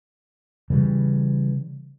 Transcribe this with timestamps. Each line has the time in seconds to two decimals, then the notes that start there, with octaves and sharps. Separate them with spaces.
0.70 C#3 E3 G3